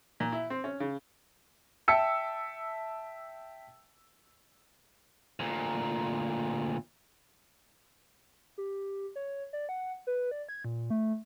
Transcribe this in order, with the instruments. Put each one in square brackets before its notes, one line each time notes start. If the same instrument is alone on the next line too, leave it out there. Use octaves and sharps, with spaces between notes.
[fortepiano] A#2
E4
C4
C#4
C#3
[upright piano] E5 G5 A5 E6 B6 C#7
[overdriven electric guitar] D2 A#2
[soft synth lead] G4
C#5
D5
F#5
B4
D5
G#6
A#2
A3